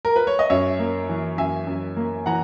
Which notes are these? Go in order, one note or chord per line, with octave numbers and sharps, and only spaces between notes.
A#4
B4
C#5
D#5
F#2 C#5 E5
A#3
E3
F#2 E5 G#5
F#2
A#3
E3 F#5 A#5